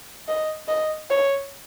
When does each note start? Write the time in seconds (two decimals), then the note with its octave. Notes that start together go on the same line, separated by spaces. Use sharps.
0.28 D#5
0.68 D#5
1.10 C#5